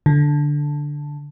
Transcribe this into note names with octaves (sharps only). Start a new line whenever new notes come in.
D3